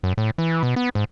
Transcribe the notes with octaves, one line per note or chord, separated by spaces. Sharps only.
F#2
A2
E3
B2
B3
G#2